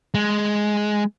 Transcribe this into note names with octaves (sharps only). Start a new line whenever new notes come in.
G#3